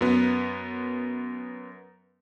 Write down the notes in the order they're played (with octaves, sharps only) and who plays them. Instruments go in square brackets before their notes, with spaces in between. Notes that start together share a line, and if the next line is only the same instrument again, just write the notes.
[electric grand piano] F#2 B3